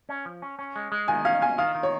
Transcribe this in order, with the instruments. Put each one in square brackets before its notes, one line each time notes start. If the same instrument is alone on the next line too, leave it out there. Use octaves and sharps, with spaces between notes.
[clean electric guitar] C#4
F3
C#4
C#4
G#3
G#3
[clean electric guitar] D#3 [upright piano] G#5
[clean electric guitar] C#4 [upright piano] F5
[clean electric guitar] F4 [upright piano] G#5
[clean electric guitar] D#3 [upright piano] F5
[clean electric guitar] D#3
[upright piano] C#5